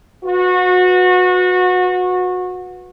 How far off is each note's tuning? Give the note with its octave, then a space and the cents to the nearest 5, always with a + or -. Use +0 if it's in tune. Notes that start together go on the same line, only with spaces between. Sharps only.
F#4 -25 B4 +0